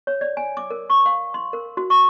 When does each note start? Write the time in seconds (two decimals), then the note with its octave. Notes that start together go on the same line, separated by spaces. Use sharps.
0.07 C#5
0.21 D5
0.37 G#5
0.57 D6
0.70 A#4
0.90 C#6
1.06 F5
1.34 C6
1.53 A#4
1.77 F#4
1.90 C#6